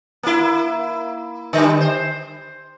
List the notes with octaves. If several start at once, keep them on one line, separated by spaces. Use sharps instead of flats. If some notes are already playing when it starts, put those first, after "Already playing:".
A#3 E4
D3 G3
C5